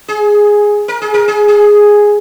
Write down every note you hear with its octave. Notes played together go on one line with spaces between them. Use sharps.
G#4
A#4
G#4
A#4
G#4
G#4